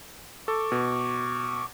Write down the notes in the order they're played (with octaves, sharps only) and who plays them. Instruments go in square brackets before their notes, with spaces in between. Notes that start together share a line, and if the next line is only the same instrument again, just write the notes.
[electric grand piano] A4 [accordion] C#6 D6
[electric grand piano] B2